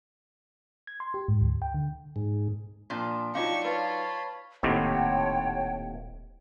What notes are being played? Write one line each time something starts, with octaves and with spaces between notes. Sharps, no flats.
G#6
C6
G4
G#2
D2
G5
D3
G#2
A#2 F3 D4
F#3 D4 D#4 F4 G4 C#5 F5 C#6
F4 B4 C#5 F5 A5 B5
D#1 D#2 A2 C3 C#5 F#5 G5 A5